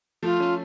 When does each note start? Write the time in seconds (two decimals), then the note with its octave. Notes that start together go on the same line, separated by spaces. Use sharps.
0.23 F3 A3 F4
0.40 A3 C#4